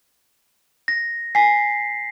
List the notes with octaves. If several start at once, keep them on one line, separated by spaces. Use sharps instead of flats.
A#6
G#5 B6 C7